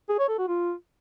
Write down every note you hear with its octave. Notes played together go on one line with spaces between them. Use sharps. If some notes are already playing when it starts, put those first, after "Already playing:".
G#4
C#5
A4
F#4
F4